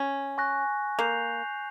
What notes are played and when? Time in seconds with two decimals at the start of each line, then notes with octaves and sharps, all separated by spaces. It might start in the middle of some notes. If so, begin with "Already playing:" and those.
Already playing: C#4
0.38 G#5 C#6 F#6 A#6
0.99 A#3 G6 C7 F7